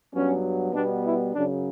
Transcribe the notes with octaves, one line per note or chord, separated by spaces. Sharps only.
G2 F#3 B3 C#4
B2 G3 B3 D4
E4
F#2 C#3 F#3 D4